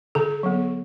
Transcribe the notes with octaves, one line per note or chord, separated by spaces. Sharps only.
D3 A4
F#3 B3